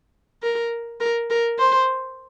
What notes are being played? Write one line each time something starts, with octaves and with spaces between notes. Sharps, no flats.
A#4
A#4
A#4
C5